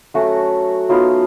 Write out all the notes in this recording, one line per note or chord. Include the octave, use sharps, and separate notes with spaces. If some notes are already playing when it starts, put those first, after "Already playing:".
F#3 A3 C#4 F#4
F#3 B3 D#4 F4